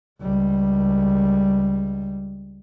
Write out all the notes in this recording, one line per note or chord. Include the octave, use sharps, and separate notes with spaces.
C#2 G3